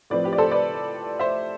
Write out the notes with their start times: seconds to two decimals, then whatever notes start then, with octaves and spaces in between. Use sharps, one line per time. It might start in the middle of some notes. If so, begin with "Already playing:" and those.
0.10 A2 F3 C4 B4 D5
0.24 G4 B4
0.33 D5
0.38 A4 C5
0.52 B4 D5
1.19 C5 E5